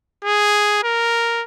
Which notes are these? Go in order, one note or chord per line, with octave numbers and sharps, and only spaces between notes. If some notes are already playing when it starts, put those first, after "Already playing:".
G#4
A#4